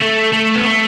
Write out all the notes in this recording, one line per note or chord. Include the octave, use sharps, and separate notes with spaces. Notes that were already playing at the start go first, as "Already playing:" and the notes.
A3
A3
B3
A3